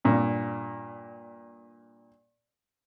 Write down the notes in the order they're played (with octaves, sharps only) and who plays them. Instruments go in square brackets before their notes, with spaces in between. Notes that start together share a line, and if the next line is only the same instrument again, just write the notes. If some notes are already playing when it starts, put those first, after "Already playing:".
[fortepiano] G2 A#2